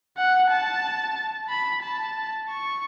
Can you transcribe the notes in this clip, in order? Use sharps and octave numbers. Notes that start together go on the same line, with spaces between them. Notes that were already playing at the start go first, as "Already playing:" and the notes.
F#5
A5
B5
A5
C#6